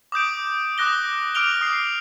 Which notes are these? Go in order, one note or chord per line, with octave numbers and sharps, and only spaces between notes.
D6 D#6 G6 D7
D6 D#6 F#6 A#6 G7
D6 F6 D7 F7 G7
D#6 C7